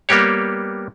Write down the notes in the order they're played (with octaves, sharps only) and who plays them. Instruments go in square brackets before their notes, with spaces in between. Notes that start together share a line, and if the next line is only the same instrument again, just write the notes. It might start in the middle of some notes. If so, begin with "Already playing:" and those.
[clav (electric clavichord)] G3 A#3 B3 G4 C#5